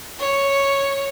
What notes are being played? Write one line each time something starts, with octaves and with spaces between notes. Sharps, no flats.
C#5